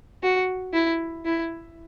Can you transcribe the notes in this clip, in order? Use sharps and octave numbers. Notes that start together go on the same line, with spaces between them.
F#4
E4
E4